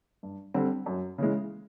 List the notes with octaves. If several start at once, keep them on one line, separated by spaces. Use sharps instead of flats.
G2
D3 G3 C4
F#2
C#3 E3 G#3